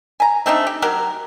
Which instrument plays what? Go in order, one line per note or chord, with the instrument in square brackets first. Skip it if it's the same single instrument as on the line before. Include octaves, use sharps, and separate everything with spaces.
[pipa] G#5 A#5
A3 C4 D4 D#4
G4
F#3 G4 A#4